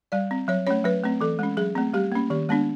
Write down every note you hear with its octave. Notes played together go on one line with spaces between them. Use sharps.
G3 D5
C4
F#3 C#5
A3 C#4 C#5
F#3 B4
A3 C4
E3 A4
G#3 C#4
F#3 G#4
A3 C4
G3 G4
A#3 C#4
D#3 G4
G#3 B3 D4